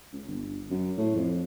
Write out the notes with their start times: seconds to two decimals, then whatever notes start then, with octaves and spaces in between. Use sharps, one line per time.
0.12 C#2
0.27 G1
0.70 F#2
0.98 A2
1.15 F2